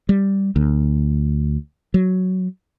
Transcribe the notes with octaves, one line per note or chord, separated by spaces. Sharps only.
G3
D2
F#3